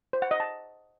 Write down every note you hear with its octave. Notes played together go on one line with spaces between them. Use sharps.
C5
F#5
D#5
A5